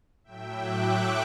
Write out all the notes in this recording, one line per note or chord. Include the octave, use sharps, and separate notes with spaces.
A2 F#3 E5 G5
D6 F#6
C#6 E6